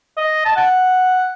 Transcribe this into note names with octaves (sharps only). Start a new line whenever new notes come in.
D#5
A5
F#5